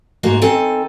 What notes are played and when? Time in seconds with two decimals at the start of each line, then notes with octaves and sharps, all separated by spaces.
0.23 G#2 A3 A#3 F#4
0.42 D#3 C4 A4 G#5